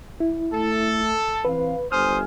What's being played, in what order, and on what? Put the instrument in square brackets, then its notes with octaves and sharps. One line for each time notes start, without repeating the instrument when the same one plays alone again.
[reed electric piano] E4
[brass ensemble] A3 [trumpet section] A4
[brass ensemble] E3 C4 F5 [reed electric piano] B4
[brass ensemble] G1 G#5 [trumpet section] C5 D#6 [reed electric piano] F6